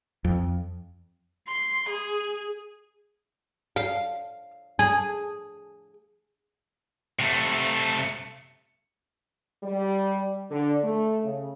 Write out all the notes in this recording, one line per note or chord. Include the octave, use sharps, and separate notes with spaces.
F2
C6
G#4
F5
G#4
C3 A3
G3
D3
A3
C#3